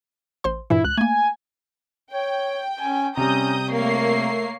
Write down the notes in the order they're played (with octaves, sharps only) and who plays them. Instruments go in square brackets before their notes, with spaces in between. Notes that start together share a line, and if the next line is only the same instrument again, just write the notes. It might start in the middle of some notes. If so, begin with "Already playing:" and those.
[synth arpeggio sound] A1 C5 C6
[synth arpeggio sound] G2 A#2 E3 [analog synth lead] E4
[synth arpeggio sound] C#2 [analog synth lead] F#6
[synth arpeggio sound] A3 A#3 [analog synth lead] G#5
[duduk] C#5 [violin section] G5
[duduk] C#4 [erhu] G#5
[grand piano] C3 G3 [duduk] C#4 [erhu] A#5 [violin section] D#6 G6
[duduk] A3 [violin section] A#3 C7 [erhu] C#5